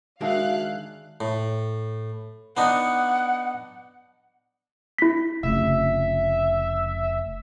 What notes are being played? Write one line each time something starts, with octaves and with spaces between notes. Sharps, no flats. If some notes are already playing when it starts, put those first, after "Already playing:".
D#3 G#3 D4 F#4 E5 F5 F#6
A2
B3 D4 D#4 F#5
E4 B6
F1 C#3 E5